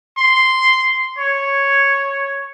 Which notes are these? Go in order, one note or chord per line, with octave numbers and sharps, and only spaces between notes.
C6
C#5